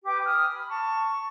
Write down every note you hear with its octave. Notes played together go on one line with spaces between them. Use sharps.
G4 B4 G5 D6
G#5 D#6 F6
B5
A5 C#6